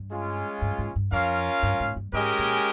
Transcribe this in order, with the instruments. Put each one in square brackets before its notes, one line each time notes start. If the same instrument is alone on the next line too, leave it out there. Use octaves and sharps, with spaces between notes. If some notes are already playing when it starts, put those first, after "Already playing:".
Already playing: [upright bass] G2
[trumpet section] G#3 C#4 F4
[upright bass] G2
G#2
G2
[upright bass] F2 [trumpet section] C#4 F4 A#4 F5
[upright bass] G2
G#2
G2
[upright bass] G#2 [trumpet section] G#3 C#4 G4 A#4 D#5
[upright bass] A#2